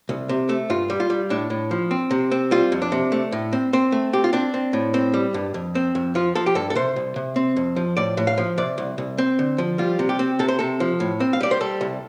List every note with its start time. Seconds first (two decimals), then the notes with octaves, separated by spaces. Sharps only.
0.09 C2
0.29 C3
0.49 A3
0.70 G2 F4
0.90 G3
1.00 F4
1.10 G3
1.30 A2 D4
1.50 A2
1.71 F3
1.91 C4
2.11 C3
2.31 C4
2.51 G3 F4
2.72 F2
2.82 D4
2.92 C3
3.12 A3
3.32 A2
3.53 C4
3.73 C4
3.92 A3
4.13 C4 G4
4.24 F4
4.33 C4 D4
4.54 C4
4.73 A2
4.94 C4
5.14 G3
5.34 G2
5.54 F2
5.75 C4
5.95 F2
6.15 F3 F4
6.35 F3 A4
6.46 G4
6.55 G2 A4
6.70 A4
6.75 C3 C5
6.96 C2
7.16 C3
7.36 C4
7.56 F2
7.76 F3
7.97 A2 D5
8.17 A2
8.27 F5
8.38 F3
8.58 C3 D5
8.78 C2
8.98 C2
9.18 C4
9.39 D3
9.58 F3
9.78 G3 F4
9.99 C3
10.09 G4
10.19 C4
10.39 C3 A4
10.48 C5
10.59 C3 A4
10.80 F3
11.00 A2
11.20 C4
11.33 F5
11.41 G3 D5
11.51 C5
11.61 G3 A4
11.81 C2